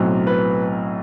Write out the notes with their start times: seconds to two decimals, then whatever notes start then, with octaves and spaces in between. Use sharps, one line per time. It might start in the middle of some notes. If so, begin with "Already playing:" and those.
Already playing: B1 A2 F#3 C4
0.27 B4